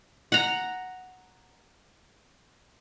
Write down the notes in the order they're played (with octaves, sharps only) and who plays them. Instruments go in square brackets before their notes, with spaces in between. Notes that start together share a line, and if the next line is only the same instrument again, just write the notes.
[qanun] F#5 A#5